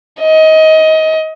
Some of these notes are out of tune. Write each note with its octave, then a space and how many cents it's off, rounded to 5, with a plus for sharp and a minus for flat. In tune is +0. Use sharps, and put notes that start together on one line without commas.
D#5 +25